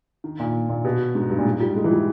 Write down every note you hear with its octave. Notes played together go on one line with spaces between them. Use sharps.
D#3
A#2
A#2
B2
G#2
G2
A#2
G#2
G3
G#3
E3
G3